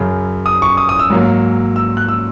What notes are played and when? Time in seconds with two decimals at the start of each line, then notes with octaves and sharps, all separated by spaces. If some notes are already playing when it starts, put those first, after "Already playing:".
Already playing: F#2 C#3 F#3
0.46 D#6
0.62 C#6
0.77 D#6
0.89 D#6
0.99 E6
1.10 G#2 F#3 A#3
1.76 E6
1.97 F#6
2.08 E6